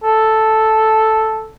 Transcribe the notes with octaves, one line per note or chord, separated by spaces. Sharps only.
A4